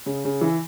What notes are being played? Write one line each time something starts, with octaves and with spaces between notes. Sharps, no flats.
C#3
C#3
E3